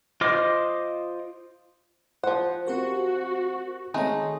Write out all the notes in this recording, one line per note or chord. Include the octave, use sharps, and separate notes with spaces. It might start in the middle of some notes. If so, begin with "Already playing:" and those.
F4 C5 D#5 D6 F6
F3 C5 F#5
C4 F#4 G4 A#4
D#3 G#3 A3 C4 D#4 C#5